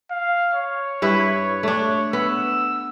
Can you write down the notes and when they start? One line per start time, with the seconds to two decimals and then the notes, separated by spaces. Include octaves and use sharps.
0.11 F5
0.54 C#5
1.02 G2 E4 B4
1.63 A3 D4 C#5
2.13 B3 E6